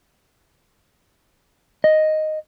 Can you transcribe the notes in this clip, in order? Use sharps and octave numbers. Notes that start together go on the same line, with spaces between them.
D#5